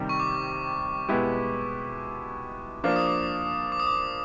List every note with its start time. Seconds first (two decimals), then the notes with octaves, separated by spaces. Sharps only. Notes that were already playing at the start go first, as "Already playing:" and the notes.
Already playing: C3 D#3 G3
0.09 C#6
0.20 D6
1.09 B2 G#3 B3 E4 G4
2.84 F3 A#3 D4 D6
2.96 D#6
3.07 D6
3.72 D6
3.80 D#6
3.87 D6